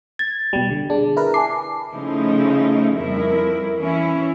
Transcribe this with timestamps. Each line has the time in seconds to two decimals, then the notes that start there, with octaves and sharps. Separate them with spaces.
0.19 G#6 A6
0.53 B2 G3
0.71 D3
0.90 D4 G#4
1.16 E4 A#4 B4
1.34 G#5 A5 D6 C7
1.92 C#3 F3 A3 D#4 E4
2.97 F2 G3 E4 A#4
3.78 E3 C#4 E4